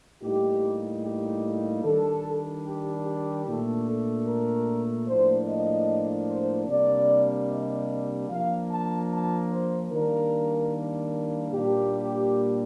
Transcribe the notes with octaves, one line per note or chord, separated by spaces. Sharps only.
A2 G3 A#3 D#4 G4
G4
D#3 G3 D4 A4
G4
G4
A#2 A3 D4
A4
A#4
A2 F3 A#3 D4 C5
D#5
C5
C3 G3 A#3 D4 D5
D#5
F3 A#3 D4 F5
A5
A5
C5
D#3 G3 A#3 D4 A#4
A#2 G3 A#3 D4 G4